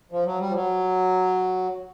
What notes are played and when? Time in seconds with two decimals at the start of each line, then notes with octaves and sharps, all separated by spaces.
0.12 F3
0.26 F#3
0.40 G3
0.49 F3
0.55 F#3